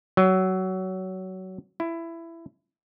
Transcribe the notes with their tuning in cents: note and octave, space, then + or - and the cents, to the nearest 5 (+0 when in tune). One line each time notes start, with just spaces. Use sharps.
F#3 +20
E4 +15